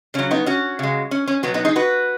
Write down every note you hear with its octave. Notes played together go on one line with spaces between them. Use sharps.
C#3 F#3 C#4
B3 D#4
C#4 F#4
C#3 G#3
C#4
C#4
B2 F#3 B3
B3 D#4
D#4 G#4
F#4 B4